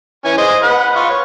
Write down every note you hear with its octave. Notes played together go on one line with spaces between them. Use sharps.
E3 C#4 G#5
G#4 C5 D#5
B4 F#5
F4 C#6
C#5